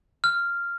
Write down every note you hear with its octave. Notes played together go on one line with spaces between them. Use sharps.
F6